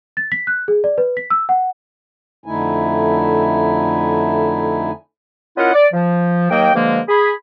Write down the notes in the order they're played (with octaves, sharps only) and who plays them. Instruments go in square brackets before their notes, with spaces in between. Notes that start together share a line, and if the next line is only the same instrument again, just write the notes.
[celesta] A6
B6
F#6
G#4
D5
B4
B6
E6
F#5
[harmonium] F2 D3 A3 D#4 E4 G#5
[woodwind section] C#4 E4 F4 A#4 D#5 F#5
D5
F3
D#2 F#3 A#3 D#5 G5
G2 D3 F3 G#3 A#3
G#4 B5